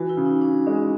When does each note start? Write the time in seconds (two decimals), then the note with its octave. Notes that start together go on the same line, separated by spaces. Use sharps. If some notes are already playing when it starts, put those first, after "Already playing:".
Already playing: E3 F#4
0.09 E4
0.17 C#3
0.25 D#4
0.42 C#3 D4
0.67 G#3 C#4
0.75 C4